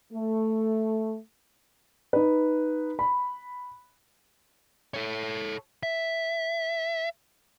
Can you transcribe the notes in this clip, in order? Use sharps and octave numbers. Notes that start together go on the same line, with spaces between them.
A3
D#4 B4
B5
A4 C#5
E5